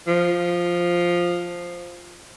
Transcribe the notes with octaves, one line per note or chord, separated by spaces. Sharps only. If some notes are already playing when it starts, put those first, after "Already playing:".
F3